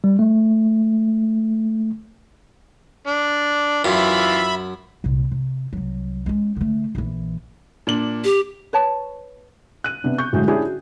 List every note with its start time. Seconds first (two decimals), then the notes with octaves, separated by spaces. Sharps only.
0.04 G3
0.19 A3
3.07 D4
3.85 F#2 E3 F4 E5 B5
5.04 C2 A#2
5.32 C3
5.73 C2 F#3
6.26 G#3 C#4
6.56 D3 A3
6.95 A#1 E3
7.87 A#2 D4 F#7
8.24 G4
8.73 B4 C#5 A5
9.84 F#6 D#7
10.04 C3 B3 D4
10.18 C#6 G6
10.33 A2 D3 F#3 G#3
10.48 C#4 D4 E4 G4 G#4
10.65 F#4